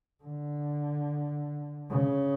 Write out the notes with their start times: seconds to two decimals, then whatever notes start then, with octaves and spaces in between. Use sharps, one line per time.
0.23 D3
1.90 C#3